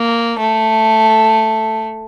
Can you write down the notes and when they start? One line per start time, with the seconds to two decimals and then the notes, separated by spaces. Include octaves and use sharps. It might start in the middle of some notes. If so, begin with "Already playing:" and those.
Already playing: A#3
0.39 A3